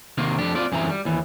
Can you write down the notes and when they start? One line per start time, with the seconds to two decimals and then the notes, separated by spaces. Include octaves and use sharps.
0.18 C3 D#3 A#3 C4
0.38 F2 D4 G4
0.55 C4 F4 D5
0.72 F#2 E3 C4 G#4 A#5
0.90 G3
1.05 D#2 E3